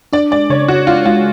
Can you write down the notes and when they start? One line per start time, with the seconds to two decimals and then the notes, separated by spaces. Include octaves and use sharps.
0.13 D4 D5
0.31 G#3 D5
0.50 C#3 C#5
0.68 C#3 F#4
0.87 D4 F4
1.06 G#3 F4